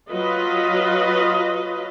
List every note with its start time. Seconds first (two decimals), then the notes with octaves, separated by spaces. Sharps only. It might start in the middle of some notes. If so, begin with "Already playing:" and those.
0.11 F#3 F4 B4 D#5